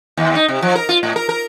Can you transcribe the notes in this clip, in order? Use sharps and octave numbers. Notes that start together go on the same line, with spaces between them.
D#2
D#4
C3
F3
A#4
F4
A2
A#4
A#4